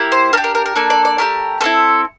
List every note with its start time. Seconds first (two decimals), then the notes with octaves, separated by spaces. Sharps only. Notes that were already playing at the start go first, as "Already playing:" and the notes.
Already playing: A#3 E4 G4
0.12 C5
0.33 D4 G4 A#4
0.44 A#4
0.55 A#4
0.66 A#4
0.75 A#3 D4 A4 D5
0.90 D5
1.05 D5
1.18 A3 D4 G4 A#4
1.61 A3 C4 E4 A4